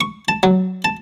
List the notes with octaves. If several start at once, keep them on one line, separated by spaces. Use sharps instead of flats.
C#6
A5
F#3
A5